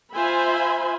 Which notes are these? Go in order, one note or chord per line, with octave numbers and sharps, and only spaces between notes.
F4 C5 E5 G#5 B5